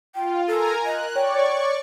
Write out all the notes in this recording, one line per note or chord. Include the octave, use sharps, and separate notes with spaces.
F4 G5
A4 A#4 G#5 A#5
D#5 F#6
C#5 D5 G5 C#6